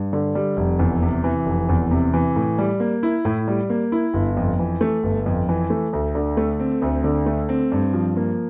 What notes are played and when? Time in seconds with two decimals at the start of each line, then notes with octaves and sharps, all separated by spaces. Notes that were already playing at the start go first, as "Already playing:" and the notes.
Already playing: G2
0.13 D3
0.35 G3
0.57 F1
0.79 E2
1.02 C3
1.24 E3
1.46 F1
1.69 E2
1.91 C3
2.13 E3
2.36 A2
2.58 G3
2.80 A#3
3.03 E4
3.25 A2
3.48 G3
3.70 A#3
3.92 E4
4.14 G1
4.37 F2
4.59 E3
4.81 A3
5.03 G1
5.26 F2
5.49 E3
5.70 A3
5.93 D2
6.15 D3
6.37 A3
6.60 C4
6.82 D2
7.04 D3
7.26 A3
7.49 C4
7.72 G2
7.94 F3
8.17 A#3